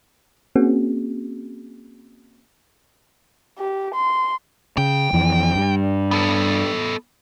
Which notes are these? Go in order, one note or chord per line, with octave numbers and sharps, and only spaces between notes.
A#3 C4 C#4 F#4 G#4
G4
C6
C#3 G5
F2 E3
G2
B3 A4